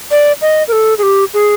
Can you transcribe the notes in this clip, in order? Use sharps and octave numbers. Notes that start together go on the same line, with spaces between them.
D5
D#5
A#4
A4
G#4
G4
G#4